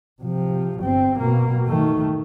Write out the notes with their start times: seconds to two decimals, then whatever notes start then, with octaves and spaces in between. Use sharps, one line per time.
0.22 C3 F3
0.80 G1 C4
1.19 B2 A#3
1.67 D#3 A3